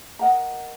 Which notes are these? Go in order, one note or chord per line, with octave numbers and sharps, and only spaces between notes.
A#4 D#5 F#5 A#5